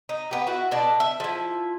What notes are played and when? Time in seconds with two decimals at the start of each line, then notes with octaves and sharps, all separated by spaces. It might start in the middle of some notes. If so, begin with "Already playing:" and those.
0.09 D#4
0.31 B3 G4
0.47 E4 F#4
0.71 B2 D4 A4
1.00 E5
1.20 F3 E4